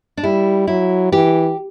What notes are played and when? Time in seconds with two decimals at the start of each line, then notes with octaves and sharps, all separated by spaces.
0.17 D4
0.24 G3 E4
0.67 F#3 E4
1.12 E3 G4